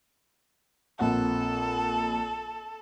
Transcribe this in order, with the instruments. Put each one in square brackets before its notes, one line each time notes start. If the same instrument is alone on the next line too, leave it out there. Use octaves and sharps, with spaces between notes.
[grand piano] A#1 C4 F#5 [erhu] A4